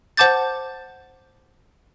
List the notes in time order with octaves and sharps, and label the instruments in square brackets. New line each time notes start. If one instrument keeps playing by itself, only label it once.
[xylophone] C5 F#5 A5 D6 G6 A6